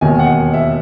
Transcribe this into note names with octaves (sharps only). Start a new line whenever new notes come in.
E1 D#2 D#3 G#5
F#5
E5